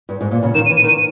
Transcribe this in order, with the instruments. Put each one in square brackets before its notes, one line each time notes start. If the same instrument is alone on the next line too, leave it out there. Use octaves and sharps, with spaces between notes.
[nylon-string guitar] G2
G#2
A#2
C#3
[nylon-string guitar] D#3 [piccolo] E7
[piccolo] D#7
[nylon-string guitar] E3
[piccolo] D#7
[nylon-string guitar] D#3
[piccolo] D#7